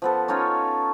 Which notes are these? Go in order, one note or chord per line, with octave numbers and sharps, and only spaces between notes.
F3 B3 A4
C#4 D#4 F4 C#5